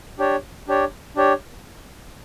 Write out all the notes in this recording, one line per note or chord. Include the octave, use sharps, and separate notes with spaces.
D4 G4 C#5
D4 G4 C#5
D4 G4 C#5